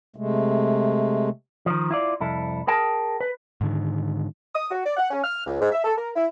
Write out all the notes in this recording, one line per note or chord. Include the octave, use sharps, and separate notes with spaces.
C3 G#3 A3
D#3 F3
E4 F4 D5
C2 F2 E4 A4
G#4 A#4 G5 A5
B4
G#2 D3 D#3
D#6
F#4
D5
F#5
C#4
F6
C#2
G#2
E5
A4
A#4
E4